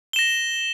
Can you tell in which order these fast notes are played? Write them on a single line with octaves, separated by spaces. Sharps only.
G7 E7 A#6